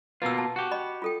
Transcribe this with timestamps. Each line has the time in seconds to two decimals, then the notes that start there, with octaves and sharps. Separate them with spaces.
0.22 B2 A#3 F4 B4 E6
0.38 A5
0.56 F#4 G4
0.71 D#5 B5
1.02 F4 A4 G5